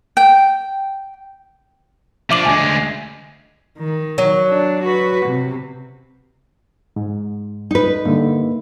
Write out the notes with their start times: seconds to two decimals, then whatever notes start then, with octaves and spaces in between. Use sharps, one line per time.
0.17 G5
2.31 F3 D4 E5 D6 F#7
2.45 D2 G#3 G#5
3.78 D#3
4.18 F#3
4.48 D4
4.83 F#4 B4
5.26 C3
6.96 G#2
7.71 D#4 B4
8.05 G2 D3 A#3